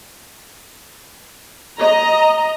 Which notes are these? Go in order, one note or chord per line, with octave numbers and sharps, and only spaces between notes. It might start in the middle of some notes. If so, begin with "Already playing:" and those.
D#5 A#5